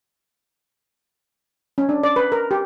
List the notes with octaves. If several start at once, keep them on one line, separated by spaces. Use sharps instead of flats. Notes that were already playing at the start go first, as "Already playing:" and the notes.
C#4
D4
D5
B4
A#4
G4